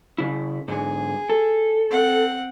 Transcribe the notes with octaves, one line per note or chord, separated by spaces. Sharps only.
C#3 E4
G#2 D3 G#4
A4
C4 F#5